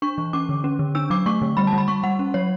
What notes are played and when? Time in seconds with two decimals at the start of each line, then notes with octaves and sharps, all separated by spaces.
0.02 D4 C#6
0.18 E3
0.33 C#4 D6
0.49 D3
0.64 C#4
0.79 D3
0.95 D4 E6
1.10 F#3 D6
1.26 A3 C#6
1.42 D3
1.57 G3 B5
1.67 A5
1.73 G3
1.78 B5
1.88 G3 C#6
2.03 G3 F#5
2.19 C#4
2.34 F#3 C#5